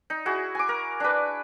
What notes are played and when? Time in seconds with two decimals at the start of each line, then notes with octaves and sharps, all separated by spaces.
0.10 D#4
0.26 E4 F#4 G#4
0.55 G#5 D6
0.69 A#4
1.00 D4 B4